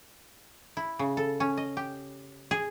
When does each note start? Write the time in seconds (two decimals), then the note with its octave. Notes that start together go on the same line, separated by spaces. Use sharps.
0.77 E4
0.99 C#3
1.17 A4
1.40 C#4
1.58 D#5
1.77 G4
2.51 G#4